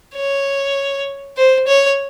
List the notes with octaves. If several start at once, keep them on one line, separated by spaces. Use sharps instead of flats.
C#5
C5
C#5